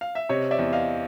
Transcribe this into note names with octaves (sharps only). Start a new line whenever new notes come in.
F5
E5
C3 C#5 D#5
D5 E5
E2
D#5 F5